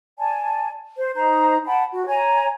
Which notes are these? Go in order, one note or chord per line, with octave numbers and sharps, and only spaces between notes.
D5 G#5 A5
C5
D#4 C5 A#5
F#5 G5 A5 B5
F#4
C#5 G#5 A#5